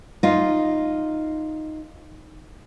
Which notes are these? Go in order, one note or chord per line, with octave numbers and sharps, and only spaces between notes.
D#4 F4